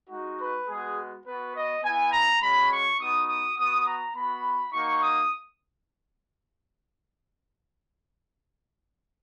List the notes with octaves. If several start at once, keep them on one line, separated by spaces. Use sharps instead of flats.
G#3 D#4 F#4
B4
G#3 B3 F#4 G#4
B3 F#4 B4
D#5
B3 E4 G#5
A#5
G#3 C#4 F#4 B5
C#6
B3 D#4 F#4 D#6
D#6
B3 F#4 D#6
A#5
B3 F#4 B5
A#3 D#4 F#4 C#6
D#6